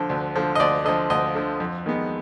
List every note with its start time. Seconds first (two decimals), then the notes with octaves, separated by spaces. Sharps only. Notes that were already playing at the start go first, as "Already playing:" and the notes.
Already playing: D3 F3
0.10 D2
0.36 D3 F3
0.55 D#5
0.60 D2 D5
0.85 D3 D#5
0.88 F3
1.10 D2 D#5
1.35 D3 F3
1.60 F2
1.86 D#3 G#3 B3